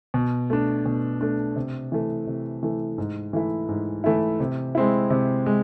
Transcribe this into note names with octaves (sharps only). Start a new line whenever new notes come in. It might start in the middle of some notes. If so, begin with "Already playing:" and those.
B2
A3 D4
B2
A3 D4
C3
E3 A3
C3
E3 A3
G#2
E3 A3 E4
G#2
E3 A3 E4
C3
G#3 C4 E4
C3
G#3